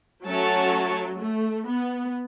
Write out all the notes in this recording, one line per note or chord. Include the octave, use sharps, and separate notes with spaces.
F#3 A3 C#4 F#4 C#5 A5
A3
B3